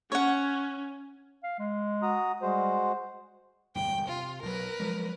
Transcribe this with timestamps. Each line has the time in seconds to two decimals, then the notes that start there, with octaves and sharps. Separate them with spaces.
0.12 C#4 C#5 F#5
1.43 F5
1.59 G#3
2.02 F#4 A#5 D#6
2.42 G3 G#3 F#4 C5
3.75 E1 D2 G2 G5
4.08 C3 F4
4.42 B1 F#3 A#4 B4
4.80 F3 F#3 G#3